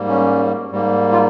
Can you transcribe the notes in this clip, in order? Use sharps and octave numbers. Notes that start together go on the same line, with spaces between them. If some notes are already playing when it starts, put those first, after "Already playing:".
Already playing: G#2 G3 A#3
C#4
G#2 G3 A#3
F4